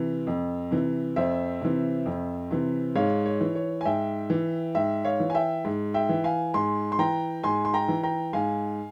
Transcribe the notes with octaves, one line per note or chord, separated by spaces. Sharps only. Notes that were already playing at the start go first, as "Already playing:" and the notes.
Already playing: C3 E3
F2
C3 E3
F2 C5 E5
C3 E3
F2
C3 E3
G#2 C#5 F5
C#5
E3
C#5
G#5
G#2 E5 G5
E3
G#2 E5 G5
C#5 F5
E3
G#5
E5 G5
G#2
E5 G5
E3
F5 G#5
G#2 G#5 C6
C6
E3 G5 A#5
G#2 G#5 C6
C6
G5 A#5
E3
G5 A#5
G#2 F5 G#5